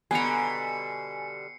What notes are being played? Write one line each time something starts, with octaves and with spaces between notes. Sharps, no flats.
B2 D3 G3 B3 G#5 A#5 C7 C#7